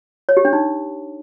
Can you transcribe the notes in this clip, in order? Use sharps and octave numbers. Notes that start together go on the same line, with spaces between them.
C#5
G4
D4
D#4